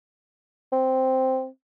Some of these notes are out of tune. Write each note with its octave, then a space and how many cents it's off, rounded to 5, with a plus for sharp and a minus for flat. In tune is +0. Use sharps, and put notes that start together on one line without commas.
C4 +0